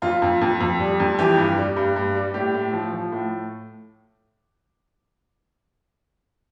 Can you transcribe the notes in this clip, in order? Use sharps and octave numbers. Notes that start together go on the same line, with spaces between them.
F2 F4
F2
F2
F2
G3
F2
E3 G4
G2
G3
G2
G2
G3
A2 G4
A2
F3
F3
A2